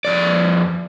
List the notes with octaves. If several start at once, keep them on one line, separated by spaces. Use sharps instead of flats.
F2 D5